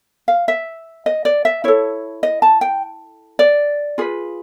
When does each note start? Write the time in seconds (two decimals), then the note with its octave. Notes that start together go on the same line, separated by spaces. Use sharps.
0.28 F5
0.48 E5
1.06 D#5
1.25 D5
1.45 E5
1.64 E4 A4 C#5
2.23 D#5
2.42 A5
2.61 G5
3.39 D5
3.98 F4 G#4 B4